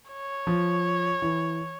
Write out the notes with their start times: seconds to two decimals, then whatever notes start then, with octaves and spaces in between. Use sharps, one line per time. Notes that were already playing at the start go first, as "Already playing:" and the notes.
0.11 C#5
0.47 F3
1.22 E3